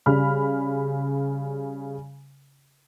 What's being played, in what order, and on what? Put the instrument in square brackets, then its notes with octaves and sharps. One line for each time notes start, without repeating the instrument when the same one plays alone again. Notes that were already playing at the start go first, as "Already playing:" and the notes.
[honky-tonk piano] C#3 G3 B5 F6